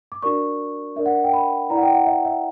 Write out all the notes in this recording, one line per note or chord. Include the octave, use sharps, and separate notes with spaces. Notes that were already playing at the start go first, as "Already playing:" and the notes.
D6
D4 F#4 A#4 D5 C#6
D4 A#4 D5 E5
F#5
G5
B5
E4 B4 D5 A#5
F#5
G5
F#5
E5
E5